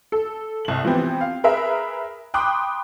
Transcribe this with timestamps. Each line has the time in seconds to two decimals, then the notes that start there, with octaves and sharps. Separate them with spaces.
0.12 A4
0.65 C2 F#7
0.85 E3 F3 B3 C4 G4
1.21 F5
1.44 G#4 A#4 B4 E5
2.34 G5 B5 C6 D6 D#6 F#6